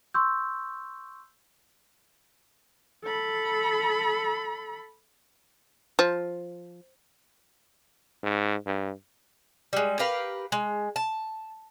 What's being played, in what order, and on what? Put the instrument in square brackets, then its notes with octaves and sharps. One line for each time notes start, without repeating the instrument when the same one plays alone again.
[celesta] C6 C#6 E6 G6
[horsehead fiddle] A4 B5
[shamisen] F3
[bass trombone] G#2
G2
[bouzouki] G3 G#3
G4 A#4 B4 F5
G#3
A5